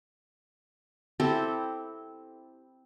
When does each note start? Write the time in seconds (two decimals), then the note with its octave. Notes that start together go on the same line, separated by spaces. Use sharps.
1.20 C4 E4 G4 A4